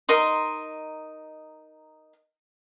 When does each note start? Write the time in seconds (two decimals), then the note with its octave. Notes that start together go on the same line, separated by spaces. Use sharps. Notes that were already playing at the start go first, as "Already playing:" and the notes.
0.09 D#4 A#4 D#5 C6